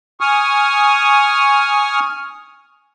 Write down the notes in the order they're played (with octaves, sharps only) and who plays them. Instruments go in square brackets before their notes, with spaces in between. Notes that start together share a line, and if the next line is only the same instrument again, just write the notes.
[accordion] G#5 C#6 D#6 F6